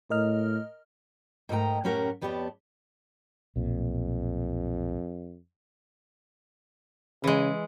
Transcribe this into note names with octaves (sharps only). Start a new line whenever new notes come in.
A2 A#4 D#5 F6
G#2 A3 A#4 D#5 G5 A#5
F#2 A2 C#4 G4 A#4 F#5
F2 B3 G4 C#5 D5 A5
B1 F2 A#2
C#3 E3 G#3